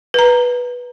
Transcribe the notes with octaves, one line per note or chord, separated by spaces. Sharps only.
B4 A#5